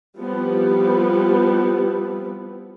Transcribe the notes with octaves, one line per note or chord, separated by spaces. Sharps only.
F3 G3 B3 C4 E4 G4